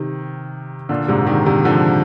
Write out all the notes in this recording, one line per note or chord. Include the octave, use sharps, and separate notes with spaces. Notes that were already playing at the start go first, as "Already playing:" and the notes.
Already playing: C3 D#3
A#2 D3
G#2 C3
C3 D#3
C3 D#3
D3 F3